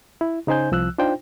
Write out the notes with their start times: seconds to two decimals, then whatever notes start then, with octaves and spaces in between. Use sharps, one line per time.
0.21 E4
0.47 C#3 D#4 C5 G#5 G6
0.72 C2 F3 E6 F#6
0.98 D4 D#4 F4 C5 G5